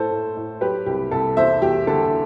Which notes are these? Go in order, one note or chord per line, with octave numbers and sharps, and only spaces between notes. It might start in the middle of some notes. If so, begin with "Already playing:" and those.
Already playing: A2 A4 C5
A2
A2
F#3 G4 B4
C2 G4
C2 A4
E2 C5 E5
E2 G4
D3 A4